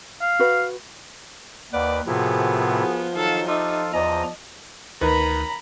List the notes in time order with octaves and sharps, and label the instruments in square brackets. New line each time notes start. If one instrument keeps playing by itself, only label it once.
[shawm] F5
[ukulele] F#4 B4
[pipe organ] D#2 B4 [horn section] A#3 F#5 [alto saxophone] D5
[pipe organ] A2 C3 E4 [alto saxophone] F3 [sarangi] B3 [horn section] F#4 G#4 A#4
[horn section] D#3 F#3 D#4 [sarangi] A4 [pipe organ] F5
[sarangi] D#4 [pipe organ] F4 A4 [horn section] G4 E5
[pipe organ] E2 A#5 [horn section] C5 D5 A5 [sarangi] D#5
[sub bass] D2 [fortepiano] D#3 B4 [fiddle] A#5 B5